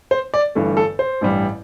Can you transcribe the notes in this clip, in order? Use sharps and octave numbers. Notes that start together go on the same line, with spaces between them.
C5
D5
G1 G2 E3 A3
A4
C5
A1 G2 G3